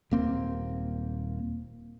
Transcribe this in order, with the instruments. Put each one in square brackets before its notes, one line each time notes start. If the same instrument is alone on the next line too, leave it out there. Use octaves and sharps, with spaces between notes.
[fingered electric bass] D#1 A#3 C4